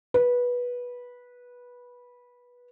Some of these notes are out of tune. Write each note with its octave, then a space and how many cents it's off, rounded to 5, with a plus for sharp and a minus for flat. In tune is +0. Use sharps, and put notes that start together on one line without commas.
B4 -15